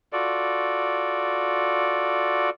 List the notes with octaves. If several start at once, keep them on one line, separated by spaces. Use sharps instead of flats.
F4 F#4 A4 D5